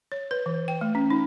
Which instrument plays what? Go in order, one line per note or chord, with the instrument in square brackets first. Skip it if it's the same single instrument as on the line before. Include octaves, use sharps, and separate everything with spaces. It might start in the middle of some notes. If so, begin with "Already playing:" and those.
[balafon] C#5
B4
E3
G5
A3
C#4
D#4